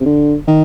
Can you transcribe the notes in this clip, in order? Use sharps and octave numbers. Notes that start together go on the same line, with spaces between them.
C3
D3
D#3